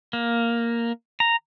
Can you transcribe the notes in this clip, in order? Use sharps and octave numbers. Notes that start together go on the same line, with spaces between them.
A#3
A#5